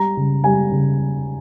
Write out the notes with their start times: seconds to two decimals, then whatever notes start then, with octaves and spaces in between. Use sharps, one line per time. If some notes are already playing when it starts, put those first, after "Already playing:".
Already playing: G3 A#5
0.17 C#3
0.44 G3 G#5
0.71 C#3